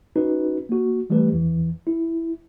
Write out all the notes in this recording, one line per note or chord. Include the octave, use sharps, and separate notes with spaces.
C#4 D#4 F#4 B4
A#3 F#4
E3 G3 A3 G4 B4
E2 E3
E4